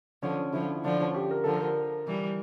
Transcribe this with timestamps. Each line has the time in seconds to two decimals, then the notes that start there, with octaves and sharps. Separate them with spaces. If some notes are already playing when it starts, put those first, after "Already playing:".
0.23 D3 F3 C#4
0.53 D3 F3 E4
0.84 D3 F3 D4
1.00 C#4
1.15 G4
1.31 A#4
1.44 D3 F3 A4
1.56 A#4
2.07 E3 G3